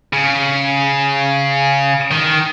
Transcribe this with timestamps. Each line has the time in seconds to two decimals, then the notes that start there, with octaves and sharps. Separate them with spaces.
0.13 C#3
2.12 D#3